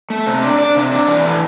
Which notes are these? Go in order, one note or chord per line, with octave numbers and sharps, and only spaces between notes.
A3
C3
D4
D4 D5
C3
D4
E3 D5
A3